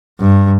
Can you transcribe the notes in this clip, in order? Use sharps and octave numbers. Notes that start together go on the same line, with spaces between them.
G2